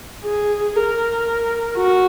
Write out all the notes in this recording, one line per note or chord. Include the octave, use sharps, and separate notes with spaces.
G#4
A#4
F#4